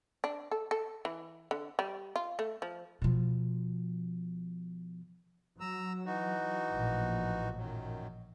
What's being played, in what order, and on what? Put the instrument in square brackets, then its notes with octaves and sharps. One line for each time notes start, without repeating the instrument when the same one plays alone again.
[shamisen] D4
A4
A4
E3
D3
G3
F4
A3
F3
[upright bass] B2 F3
[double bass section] F#3 [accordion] A#5 E6
[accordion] E3 D#4 F#4
[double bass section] A1 A#2 F3
[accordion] F#2 D#3 F#3